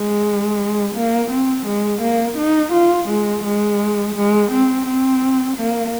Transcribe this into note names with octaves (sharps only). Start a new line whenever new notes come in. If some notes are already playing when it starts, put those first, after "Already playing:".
Already playing: G#3
A#3
C4
G#3
A#3
D#4
F4
G#3
G#3
G#3
C4
C4
A#3